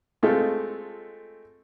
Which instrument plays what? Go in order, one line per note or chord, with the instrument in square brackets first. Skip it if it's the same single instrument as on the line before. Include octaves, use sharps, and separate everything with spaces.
[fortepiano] G#3 A3 C4 F4 A4